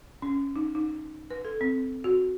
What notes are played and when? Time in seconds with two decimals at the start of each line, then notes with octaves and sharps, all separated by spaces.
0.22 C#4
0.56 D#4
0.75 D#4
1.31 B4
1.45 A4
1.61 C4
2.04 F#4